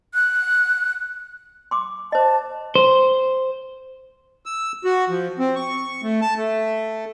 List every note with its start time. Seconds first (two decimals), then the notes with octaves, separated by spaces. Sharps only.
0.14 F#6
1.71 C6 D6
2.12 C5 D#5 A5
2.75 C5
4.46 E6
4.84 F#4
5.10 F3
5.39 C4
5.56 C#6
6.03 A3
6.22 A5
6.37 A3